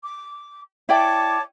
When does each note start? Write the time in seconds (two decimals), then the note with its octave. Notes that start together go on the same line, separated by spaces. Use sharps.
0.03 D6
0.89 E4 C#5 D5 G5 A5 D6